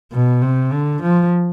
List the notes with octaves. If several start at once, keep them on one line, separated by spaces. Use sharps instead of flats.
B2
C3
D3
F3